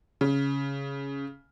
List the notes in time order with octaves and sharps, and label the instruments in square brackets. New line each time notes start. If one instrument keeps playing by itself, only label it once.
[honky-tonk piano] C#3